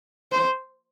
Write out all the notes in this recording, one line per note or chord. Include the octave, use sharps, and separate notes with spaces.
C5